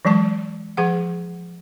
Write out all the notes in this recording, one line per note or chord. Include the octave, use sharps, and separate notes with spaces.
E3 F#3 G#3 A5
F3 G#4 F#5